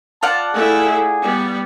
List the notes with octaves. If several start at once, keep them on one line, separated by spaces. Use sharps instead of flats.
F4 D5 F#5 A5
A3 E4 G#4
G3 B3